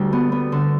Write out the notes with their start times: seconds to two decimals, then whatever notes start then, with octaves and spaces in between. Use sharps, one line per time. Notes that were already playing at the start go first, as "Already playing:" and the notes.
Already playing: D2 G3
0.13 B3
0.32 B3
0.52 D3